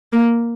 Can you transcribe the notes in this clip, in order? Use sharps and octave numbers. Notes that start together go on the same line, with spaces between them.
A#3